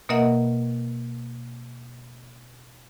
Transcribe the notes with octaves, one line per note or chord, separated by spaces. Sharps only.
B2 A#3 A#4 D#5 E5 F#5